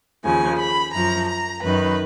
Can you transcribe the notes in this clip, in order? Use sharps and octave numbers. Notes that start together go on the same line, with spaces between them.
D#2 C#3 F3 G#5
B5
F#2 F3 A#5
A#5
F#2 D#3 B4